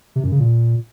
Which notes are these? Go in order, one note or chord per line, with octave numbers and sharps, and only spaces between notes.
C3
F#2
C#3
A#2